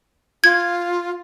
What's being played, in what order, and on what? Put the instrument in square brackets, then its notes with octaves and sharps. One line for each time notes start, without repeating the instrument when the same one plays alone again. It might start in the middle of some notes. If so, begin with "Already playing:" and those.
[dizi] F4 [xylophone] G#6